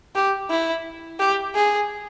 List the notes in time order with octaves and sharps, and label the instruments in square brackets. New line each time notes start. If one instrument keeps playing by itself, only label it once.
[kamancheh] G4
E4
G4
G#4